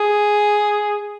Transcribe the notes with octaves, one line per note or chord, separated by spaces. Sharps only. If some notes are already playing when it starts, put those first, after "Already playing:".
Already playing: G#4